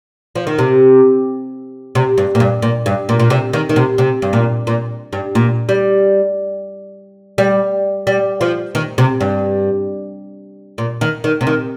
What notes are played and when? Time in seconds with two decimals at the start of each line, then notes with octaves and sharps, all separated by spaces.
0.36 F3
0.47 D#3
0.59 C3
1.95 C3
2.18 G2
2.35 A#2
2.40 G2
2.62 A#2
2.86 G2
3.09 A#2
3.20 A#2
3.30 C3
3.53 D#3
3.69 D#3
3.76 C3
3.98 C3
4.22 G2
4.33 A#2
4.67 A#2
5.13 G2
5.35 A#2
5.69 G3
7.38 G3
8.07 G3
8.41 F3
8.75 D#3
8.98 C3
9.21 G2
10.78 A#2
11.01 D#3
11.24 D#3
11.41 C3
11.47 D#3